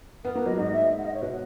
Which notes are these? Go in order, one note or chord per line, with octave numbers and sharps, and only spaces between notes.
B3 A#4
A#3 B4
F#3 D#5
G#2 D#5
E5
F#5
D#5
C#5
B2 B4